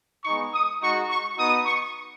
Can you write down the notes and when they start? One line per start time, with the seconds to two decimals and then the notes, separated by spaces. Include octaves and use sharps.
0.25 G#3 B3 D#4 C#6
0.53 D#6
0.82 G#3 D#4 F#4 C#6
1.09 C#6
1.38 B3 D#4 F#4 D#6
1.66 C#6